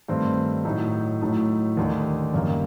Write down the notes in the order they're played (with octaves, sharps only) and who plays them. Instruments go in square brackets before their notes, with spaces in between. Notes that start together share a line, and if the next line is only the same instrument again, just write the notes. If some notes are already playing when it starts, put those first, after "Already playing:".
[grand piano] G2 D#3 A3 C4
A2 F#3 A3 D#4
A2 F#3 A3 D#4
D#2 D3 A3 D#4
F#1 F#2 D#3 G3 A#3